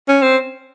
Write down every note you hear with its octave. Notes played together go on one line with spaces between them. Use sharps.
C#4
C4